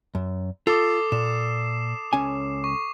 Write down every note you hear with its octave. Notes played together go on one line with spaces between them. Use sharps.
F#2
F4 A4 D6 D#6 C7
A#2 E7
C#2 C#4 G#5
C#6